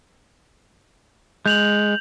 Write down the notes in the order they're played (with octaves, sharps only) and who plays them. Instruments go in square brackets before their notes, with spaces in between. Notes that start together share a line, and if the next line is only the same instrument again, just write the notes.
[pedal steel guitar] G#3 [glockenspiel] G6 F7 F#7